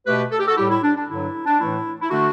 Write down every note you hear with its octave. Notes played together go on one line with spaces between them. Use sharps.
B2 A3 G4 B4
A4
G4
F#4 A4
A2 G3 E4 G4
E4
D4
D4
G2 D3 F#3 E4
D4
A2 E3 A3 E4
E4
D3 A3 D4 F#4